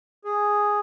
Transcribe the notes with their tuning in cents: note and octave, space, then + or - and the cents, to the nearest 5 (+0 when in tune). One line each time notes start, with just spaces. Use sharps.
G#4 -5